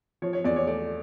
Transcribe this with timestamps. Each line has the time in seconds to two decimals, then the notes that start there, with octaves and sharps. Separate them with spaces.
0.22 F3 C#5
0.33 C#5
0.44 E2 D5
0.56 C#5
0.67 A3 D5